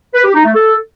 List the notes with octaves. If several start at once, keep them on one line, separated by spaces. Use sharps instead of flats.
B4
G4
D#4
A3
A4